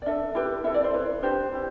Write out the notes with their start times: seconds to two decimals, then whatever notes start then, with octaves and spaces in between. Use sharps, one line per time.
0.02 D5
0.06 D4 A4 E5
0.35 E4 G4 B4
0.64 E4 A4 E5
0.74 D5
0.84 C5
0.94 E4 B4
1.22 D4 G4 B4 C5
1.52 E4 G4